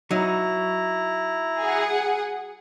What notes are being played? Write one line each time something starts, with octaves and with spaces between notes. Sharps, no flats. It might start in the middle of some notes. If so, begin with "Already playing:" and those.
F#3 D#4 E4 A#5
G#4 F#5